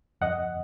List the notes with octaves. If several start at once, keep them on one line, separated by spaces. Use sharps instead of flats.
F2 D#5 F#5